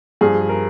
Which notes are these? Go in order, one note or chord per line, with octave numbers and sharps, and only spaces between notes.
G2 F3 G#4
A#4